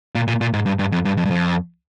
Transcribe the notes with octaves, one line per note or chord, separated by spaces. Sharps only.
A#2
A#2
A#2
G#2
G2
G2
F2
G2
F2
G2
F2